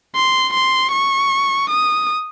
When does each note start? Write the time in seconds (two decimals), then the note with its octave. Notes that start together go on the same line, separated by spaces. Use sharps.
0.15 C6
0.53 C6
0.92 C#6
1.70 D#6